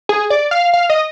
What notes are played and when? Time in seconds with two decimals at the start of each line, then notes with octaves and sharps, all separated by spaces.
0.09 G#4
0.30 D5
0.51 F5
0.74 F5
0.90 D#5